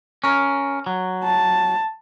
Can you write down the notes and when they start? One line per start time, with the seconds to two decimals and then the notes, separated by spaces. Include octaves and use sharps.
0.24 C#4 A#4
0.86 F#3
1.24 A5